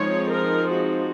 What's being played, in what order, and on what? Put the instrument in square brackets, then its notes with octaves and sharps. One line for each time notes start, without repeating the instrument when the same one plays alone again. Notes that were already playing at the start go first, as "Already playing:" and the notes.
Already playing: [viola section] F3 G#3 C4 D#4 C#5
A#4
F#4